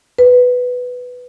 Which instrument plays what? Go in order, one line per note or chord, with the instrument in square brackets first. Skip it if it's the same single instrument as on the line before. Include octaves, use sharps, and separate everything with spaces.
[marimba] B4